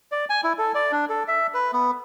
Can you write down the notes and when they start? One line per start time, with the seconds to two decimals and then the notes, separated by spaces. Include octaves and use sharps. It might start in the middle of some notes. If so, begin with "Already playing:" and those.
0.12 D5
0.30 G#5
0.44 E4
0.58 A4
0.75 D5
0.92 D4
1.09 A4
1.28 E5
1.54 B4
1.73 B3